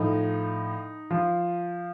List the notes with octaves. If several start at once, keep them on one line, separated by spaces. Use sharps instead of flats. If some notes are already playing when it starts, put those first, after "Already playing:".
Already playing: A2 F3 D#4
F3 F4